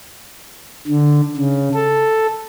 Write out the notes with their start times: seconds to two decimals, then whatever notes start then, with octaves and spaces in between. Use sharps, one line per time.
0.87 D3
1.36 C#3
1.74 A4